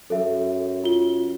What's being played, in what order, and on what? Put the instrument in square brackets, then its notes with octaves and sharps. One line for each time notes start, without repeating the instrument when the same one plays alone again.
[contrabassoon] F#2 [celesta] A4 E5
[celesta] F4 G7